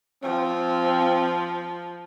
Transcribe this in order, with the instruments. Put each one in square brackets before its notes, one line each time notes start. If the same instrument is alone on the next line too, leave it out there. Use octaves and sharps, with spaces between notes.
[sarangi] F3 [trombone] C4